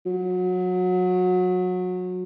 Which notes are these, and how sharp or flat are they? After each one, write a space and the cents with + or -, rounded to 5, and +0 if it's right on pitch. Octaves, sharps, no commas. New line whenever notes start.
F#3 -25